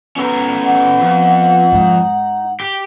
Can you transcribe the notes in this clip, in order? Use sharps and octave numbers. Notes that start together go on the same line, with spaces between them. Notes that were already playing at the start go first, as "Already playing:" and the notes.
B3 C#4 A4 A#5
F#5
F2
G#2 D#4
G4